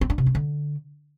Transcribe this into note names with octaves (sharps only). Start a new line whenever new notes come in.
C4
D4
C3
C#4
D3